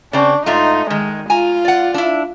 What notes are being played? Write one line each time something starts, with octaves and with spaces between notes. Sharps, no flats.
C#3 C4 D4
G#2 A3 D#4 F4
D#3 G#3
F4 G#5 A#5
D5 F#5
D4 E4